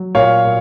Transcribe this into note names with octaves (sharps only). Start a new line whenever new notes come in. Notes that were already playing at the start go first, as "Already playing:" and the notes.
Already playing: F#3
A#2 C#5 F5
A#2